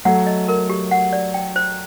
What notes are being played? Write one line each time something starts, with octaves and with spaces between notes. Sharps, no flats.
F#3 A3 F#5
D#5
A#4
G4
F#5
D5
G5
C5